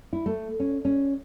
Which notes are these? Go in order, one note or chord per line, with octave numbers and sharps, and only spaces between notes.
E4
A3
C#4
C#4